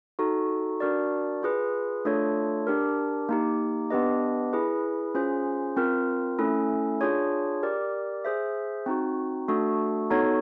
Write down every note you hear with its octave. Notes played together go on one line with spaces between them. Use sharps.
D#4 F#4 A4
D4 F#4 A#4 D5
F4 G#4 B4
A3 D4 F4 A4 C#5
D4 G4 A#4
A#3 D#4 G4
B3 D4 G4 B4 D#5
E4 G#4 B4
C#4 F4 G#4 C5
C4 F4 A#4
A3 C#4 E4 A4
D4 F4 G#4 C#5
G4 A#4 D5
G#4 C5 E5
C4 D#4 F#4
A3 D4 F#4 A4
B3 D#4 F#4 A4 C#5